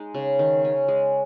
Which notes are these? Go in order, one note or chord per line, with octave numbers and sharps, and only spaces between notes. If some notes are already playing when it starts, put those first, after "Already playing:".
Already playing: G#3 D#4
C#3
D#3
C#4
G#3